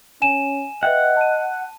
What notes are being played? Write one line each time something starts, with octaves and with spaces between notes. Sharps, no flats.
C#4 G#5 D#7 E7
B4 D#5 E5 F#5 G5
A5 D#7